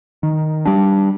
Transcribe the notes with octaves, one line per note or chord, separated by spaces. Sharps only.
D#3
G3 D4